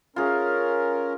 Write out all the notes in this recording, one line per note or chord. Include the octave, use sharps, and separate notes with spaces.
C#4 F4 G#4 A#4